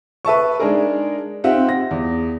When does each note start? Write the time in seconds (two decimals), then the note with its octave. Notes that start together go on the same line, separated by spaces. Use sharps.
0.25 B4 E5 A5 C#6
0.59 G#3 D4 D#4 G#4 A#4
1.44 C4 D#4 F4 G4 E5 F#5
1.69 A#6
1.91 E2